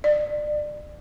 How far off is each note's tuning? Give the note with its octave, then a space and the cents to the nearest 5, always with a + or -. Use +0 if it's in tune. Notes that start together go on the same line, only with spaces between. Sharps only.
D5 +25